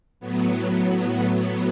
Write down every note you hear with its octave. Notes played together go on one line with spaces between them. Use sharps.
A2 F#3 B3